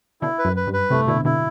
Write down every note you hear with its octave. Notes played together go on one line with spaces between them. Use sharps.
B2 D3 E4
B4
F#2
B4
G2
B4
A2 C3 A3
B2 D3 E4
B2 D3 E4